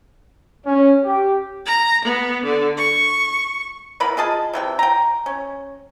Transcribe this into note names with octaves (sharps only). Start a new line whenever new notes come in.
C#4
G4
A#5
B3
D3
C#6
E3 B3 A#4 B5
F4 G#4 D#5 A5
C3 E3 G5
G5 A#5
C#4